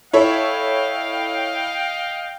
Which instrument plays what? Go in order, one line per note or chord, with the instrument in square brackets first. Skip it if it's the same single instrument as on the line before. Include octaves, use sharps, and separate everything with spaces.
[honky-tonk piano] E4 A4 C#5 [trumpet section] D#5 F5 G5